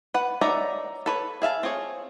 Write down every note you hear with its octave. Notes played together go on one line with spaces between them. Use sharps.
B4 F#5
D#4 C#5 D5 E5 A#5
A4 B4 C#5
G#4 E5 F5 A5
C4 F4 G#4 C#5